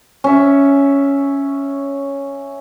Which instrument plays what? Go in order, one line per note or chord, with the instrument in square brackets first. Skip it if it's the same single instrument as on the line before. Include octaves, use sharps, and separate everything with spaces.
[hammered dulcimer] C#4 E5